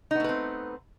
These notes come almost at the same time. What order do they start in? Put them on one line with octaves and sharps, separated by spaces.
D#4 B3 A3 B4 C4